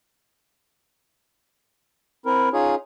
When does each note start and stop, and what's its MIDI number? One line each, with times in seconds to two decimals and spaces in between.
2.26 2.49 60
2.26 2.49 64
2.26 2.49 70
2.53 2.75 61
2.53 2.75 63
2.53 2.75 65
2.53 2.75 68
2.53 2.75 73